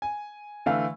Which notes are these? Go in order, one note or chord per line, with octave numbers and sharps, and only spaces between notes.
G#5
D3 E3 A3 F5